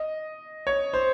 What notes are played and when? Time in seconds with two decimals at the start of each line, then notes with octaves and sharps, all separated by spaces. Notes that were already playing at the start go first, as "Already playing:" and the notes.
Already playing: D#5
0.67 C#5
0.93 C5